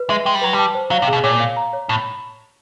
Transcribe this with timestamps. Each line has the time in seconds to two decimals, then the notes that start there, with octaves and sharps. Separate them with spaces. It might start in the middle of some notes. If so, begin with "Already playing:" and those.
Already playing: B4
0.09 G#3 E5
0.26 G#3 G5
0.35 G3
0.42 F#3 B4
0.53 G3
0.59 A5
0.75 C5
0.91 F#3 F5
1.02 C3
1.08 B2 G#4
1.24 A#2 C#5
1.40 F5
1.57 A#5
1.73 C#5
1.89 A2 B5